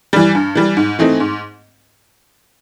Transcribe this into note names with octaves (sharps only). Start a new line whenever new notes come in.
E3 G3
G2
E3 G3
G#2
E3 A3 C4 D#4
G#2